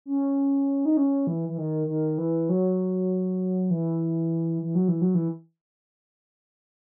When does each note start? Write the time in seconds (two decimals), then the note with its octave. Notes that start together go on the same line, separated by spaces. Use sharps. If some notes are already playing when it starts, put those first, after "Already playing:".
0.06 C#4
0.85 D#4
0.97 C#4
1.27 E3
1.49 E3
1.58 D#3
1.88 D#3
2.18 E3
2.49 F#3
3.71 E3
4.62 E3
4.75 F#3
4.88 E3
5.01 F#3
5.15 E3